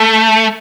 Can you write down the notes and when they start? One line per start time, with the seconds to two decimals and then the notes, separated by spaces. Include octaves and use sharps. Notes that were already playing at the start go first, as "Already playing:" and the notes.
Already playing: A3